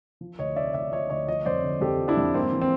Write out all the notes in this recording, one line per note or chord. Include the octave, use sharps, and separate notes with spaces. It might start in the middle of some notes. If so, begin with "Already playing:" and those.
F3
D2 C#5 D#5
C3 D5 E5
D2 D5 E5
F3 C#5 D#5
D2 C#5 D#5
F3 C#5 D#5
F2 C5 D5
D3
F2 G4 A4
F3
D4 E4
F2
G#2 A#3 C4
E3
C4